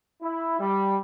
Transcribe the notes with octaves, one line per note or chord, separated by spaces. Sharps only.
E4
G3